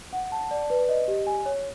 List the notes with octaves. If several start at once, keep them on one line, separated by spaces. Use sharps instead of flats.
F#5
A5
D5
B4
D#5
G4
G#5
C#5